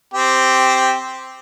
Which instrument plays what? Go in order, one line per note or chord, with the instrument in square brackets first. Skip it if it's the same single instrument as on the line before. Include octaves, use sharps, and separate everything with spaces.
[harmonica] C4 G4